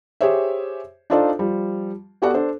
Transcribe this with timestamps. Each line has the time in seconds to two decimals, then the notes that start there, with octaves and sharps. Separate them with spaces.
0.21 G4 G#4 C5 C#5 E5
1.10 D4 D#4 F4 A4 C5 D5
1.39 F3 G3
2.22 B3 F#4 G4 A4 D5 F#5
2.34 D4 A4 C5